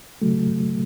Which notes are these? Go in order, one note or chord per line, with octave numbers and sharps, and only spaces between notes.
C#3 F#3 A3